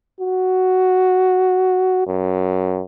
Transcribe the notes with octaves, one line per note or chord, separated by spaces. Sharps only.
F#4
F#2